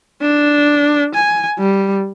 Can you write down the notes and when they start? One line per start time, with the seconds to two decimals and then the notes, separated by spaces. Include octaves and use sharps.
0.22 D4
1.15 G#5
1.59 G3